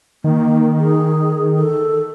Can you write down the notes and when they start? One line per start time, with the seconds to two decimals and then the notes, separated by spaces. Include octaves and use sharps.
0.24 D#3 A#3
0.79 G#4
1.57 A4